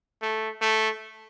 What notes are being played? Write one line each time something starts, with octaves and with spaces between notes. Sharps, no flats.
A3
A3